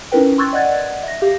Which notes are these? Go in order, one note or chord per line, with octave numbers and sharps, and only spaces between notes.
C#4 D#4 E4 A#4 B4 G5
C6 C#6 E6 F#6 G#6 A6
D5 D#5 F#5 F#6 G#6 A6
E5 A#6
G4 F5